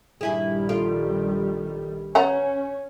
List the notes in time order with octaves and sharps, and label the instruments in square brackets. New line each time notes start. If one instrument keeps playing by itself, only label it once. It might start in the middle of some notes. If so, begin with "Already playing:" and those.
[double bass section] A#1 D#3 G3 [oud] G2 E4 G#4
[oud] F4 [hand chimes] A4
[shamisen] B3 F#5 A#5 [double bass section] C#4 [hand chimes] C#5